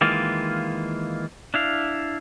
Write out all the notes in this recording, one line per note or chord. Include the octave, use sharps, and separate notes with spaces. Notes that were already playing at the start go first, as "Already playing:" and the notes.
D#3 E3 G#3 A#3 F4
D4 E4 F5